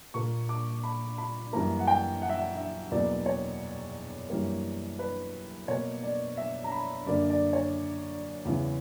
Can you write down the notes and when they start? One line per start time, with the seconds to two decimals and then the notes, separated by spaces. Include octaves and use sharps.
0.14 A#2 A#3 C#6
0.49 D6
0.84 B5
1.18 B5
1.53 F#2 E3 G3 A#3 A#5
1.79 F#5
1.87 G5
2.22 F#5
2.29 E5
2.37 F#5
2.57 E5
2.91 E2 B2 F#3 A#3 D5
3.26 C#5
4.30 F#2 E3 G3 A#3
4.99 B4
5.68 B2 A#3 C#5
6.03 D5
6.37 E5
6.64 A#5
6.72 B5
7.06 F#2 D3 A#3 D5
7.30 D5
7.53 C#5
8.45 E2 C#3 E3